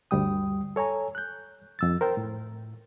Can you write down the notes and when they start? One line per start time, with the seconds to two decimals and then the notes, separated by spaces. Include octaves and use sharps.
0.11 D2 G2 G3 G5 D#6
0.76 A4 C#5 G#5 A#5
1.15 F#6 G6
1.79 F2 E6 A6
2.01 A#4 C5 G5
2.17 A2